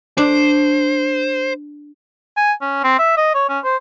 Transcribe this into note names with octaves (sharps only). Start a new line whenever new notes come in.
D4 C5
G#5
C#4
C4
E5
D#5
C#5
C#4
C5